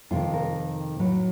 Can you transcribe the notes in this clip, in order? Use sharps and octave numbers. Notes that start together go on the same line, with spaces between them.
F2 C3 D#3 F4
A#4
A2 F#3